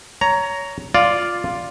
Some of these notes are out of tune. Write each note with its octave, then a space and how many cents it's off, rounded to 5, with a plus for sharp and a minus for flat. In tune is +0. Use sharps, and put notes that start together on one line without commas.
C#5 +20 A#5 +0
F4 +5 D5 +0